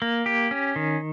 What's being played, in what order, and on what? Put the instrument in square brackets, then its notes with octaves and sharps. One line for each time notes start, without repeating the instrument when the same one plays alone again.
[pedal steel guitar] A#3
G4
C#4
D#3